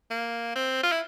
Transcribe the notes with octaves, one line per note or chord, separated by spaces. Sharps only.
A#3
C4
F4
E4